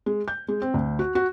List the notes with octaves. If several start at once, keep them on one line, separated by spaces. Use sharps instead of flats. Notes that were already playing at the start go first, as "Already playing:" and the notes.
G#3
G6
G#3
C4
D2
F#4
F#4